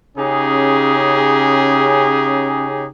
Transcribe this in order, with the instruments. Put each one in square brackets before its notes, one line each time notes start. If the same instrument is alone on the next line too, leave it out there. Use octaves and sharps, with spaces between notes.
[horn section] C#3 C#4 D#4 G4 G#4